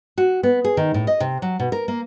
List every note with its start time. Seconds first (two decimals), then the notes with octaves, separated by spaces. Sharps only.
0.18 F#4
0.43 B3
0.64 G#4
0.77 D#3
0.94 A2
1.07 D#5
1.20 C3
1.42 F#3
1.60 B2
1.72 A#4
1.88 A#3